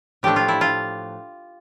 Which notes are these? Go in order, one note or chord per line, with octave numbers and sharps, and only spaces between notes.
A2 F3 A3 D4 G4
F4
E4
F4